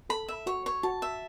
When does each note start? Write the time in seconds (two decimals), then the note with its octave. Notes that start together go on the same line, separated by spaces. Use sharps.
0.10 A4 B5
0.28 E5
0.46 F#4 C#5
0.66 C#5
0.83 F#4 A5
1.02 E5